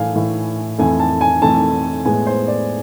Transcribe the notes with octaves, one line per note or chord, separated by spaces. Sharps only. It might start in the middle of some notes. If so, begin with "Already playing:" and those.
Already playing: A2 E3 A3 F5 G#5
A2 E3 A3
F2 E3 A3 G#5
A5
G#5
F2 E3 A3 A5
A2 G#3 B3 G#5
C5
D5